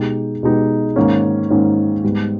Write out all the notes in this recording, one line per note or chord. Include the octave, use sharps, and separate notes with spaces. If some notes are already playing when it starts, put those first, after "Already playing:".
Already playing: B2 G#3 D#4 G4
B2 G#3 D#4 G4
G#2 D#3 A#3 C#4
G#2 D#3 A#3 C#4
G#2 G3 B3